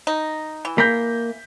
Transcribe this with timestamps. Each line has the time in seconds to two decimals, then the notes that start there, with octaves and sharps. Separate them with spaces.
0.07 D#4
0.65 E3
0.78 A#3 G6 A#6 B6